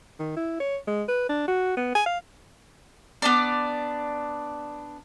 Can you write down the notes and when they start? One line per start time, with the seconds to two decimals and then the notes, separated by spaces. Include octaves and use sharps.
0.20 D#3
0.36 E4
0.60 C#5
0.87 G#3
1.08 B4
1.29 D4
1.48 F#4
1.77 B3
1.95 G#5
2.06 F5
3.22 B3 D4 D5